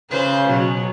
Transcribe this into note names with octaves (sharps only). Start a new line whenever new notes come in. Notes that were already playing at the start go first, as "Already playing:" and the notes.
C#3 B4 C5
B2 F#3